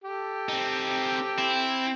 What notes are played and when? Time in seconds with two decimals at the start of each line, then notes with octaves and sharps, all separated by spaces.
0.04 G4 A4
0.49 C4 D#4
1.39 C4 E4